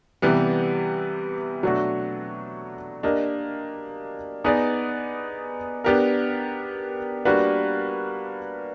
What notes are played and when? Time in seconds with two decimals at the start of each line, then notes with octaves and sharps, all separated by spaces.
0.22 C3 E3 G3 B3
1.63 B2 F#3 A3 D4 F#4
3.03 A#3 D4 G4 A#4 D#5
4.44 B3 D#4 G#4 B4 D5
5.84 B3 D4 G4 A#4
7.25 G3 A#3 D4 F#4 B4